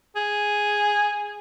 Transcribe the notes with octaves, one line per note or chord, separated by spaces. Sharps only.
G#4